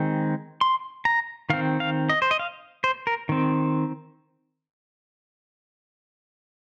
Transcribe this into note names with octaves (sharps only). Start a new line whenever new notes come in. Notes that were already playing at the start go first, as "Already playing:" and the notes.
Already playing: D#3 G#3 C4
C6
A#5
D#3 C4 F5
F5
D#5
C5
D#5
F5
C5
A#4
D#3 C4